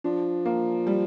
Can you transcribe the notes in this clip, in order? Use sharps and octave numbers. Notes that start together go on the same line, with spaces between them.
F3 D4
A#3
G3